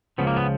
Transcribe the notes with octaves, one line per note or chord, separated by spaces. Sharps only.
C#2 C#3 F3 B3
A#3
B3